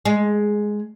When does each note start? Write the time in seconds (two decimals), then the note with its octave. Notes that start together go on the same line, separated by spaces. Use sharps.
0.05 G#3